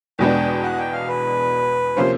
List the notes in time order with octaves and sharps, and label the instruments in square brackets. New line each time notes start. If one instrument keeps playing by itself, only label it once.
[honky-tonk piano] E2 B2 G#3 B3 D4 [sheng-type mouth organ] G5
[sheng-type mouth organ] F#5
G5
F5
B4
[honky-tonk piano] C3 F3 A#3 C#4 [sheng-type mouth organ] C5